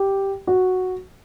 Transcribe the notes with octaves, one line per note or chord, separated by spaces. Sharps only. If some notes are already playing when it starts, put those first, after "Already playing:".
Already playing: G4
F#4